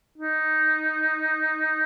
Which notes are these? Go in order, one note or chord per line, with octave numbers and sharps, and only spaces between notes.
D#4